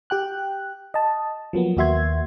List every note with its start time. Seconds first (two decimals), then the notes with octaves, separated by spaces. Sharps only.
0.10 G4 G5 F#6
0.94 D#5 A5
1.53 F3 F#3 A#3 B3
1.77 D#2 A#3 F#4 E5 C6 G#6